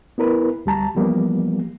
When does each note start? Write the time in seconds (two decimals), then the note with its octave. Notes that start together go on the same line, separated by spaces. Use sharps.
0.18 B3 E4 A#4 B4
0.66 D2 G3 A5 A#5
0.95 E3 F3 G3 A#3 B3